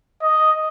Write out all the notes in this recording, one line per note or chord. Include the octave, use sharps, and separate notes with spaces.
D#5